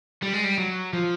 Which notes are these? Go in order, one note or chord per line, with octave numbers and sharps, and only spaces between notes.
G3
G#3
G3
F#3
F3